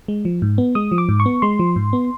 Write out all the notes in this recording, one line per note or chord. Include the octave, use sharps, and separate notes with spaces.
G#3
F3
G#2
B3
G#3 D#6
F3
D6
G#2
C#6
B3
G#3 C6
F3
G#2
B3